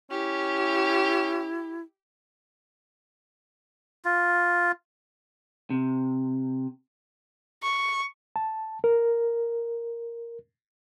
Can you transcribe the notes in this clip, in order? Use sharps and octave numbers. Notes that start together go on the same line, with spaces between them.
C#4 E4 G4
F4
C3
C#6
A5
A#4